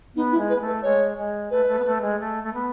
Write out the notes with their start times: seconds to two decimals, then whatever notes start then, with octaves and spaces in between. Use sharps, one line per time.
0.15 B3 D#4
0.32 E4
0.38 G#3
0.49 B4
0.55 B3
0.61 A3
0.66 B4
0.83 G#3 C#5
1.18 G#3
1.51 A3 B4
1.64 G#3
1.68 A3
1.79 B3
1.85 A3
2.02 G#3
2.20 A3
2.44 A3
2.54 B3